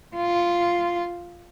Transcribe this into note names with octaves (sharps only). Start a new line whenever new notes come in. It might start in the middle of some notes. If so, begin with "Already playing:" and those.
F4